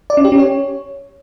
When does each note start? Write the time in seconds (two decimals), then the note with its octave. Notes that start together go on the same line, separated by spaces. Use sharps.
0.10 D5
0.17 C#4
0.25 G4
0.32 C#4
0.39 C#5